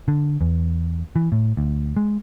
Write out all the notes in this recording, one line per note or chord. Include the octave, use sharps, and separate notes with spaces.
D3
E2
E3
A2
D2
G#3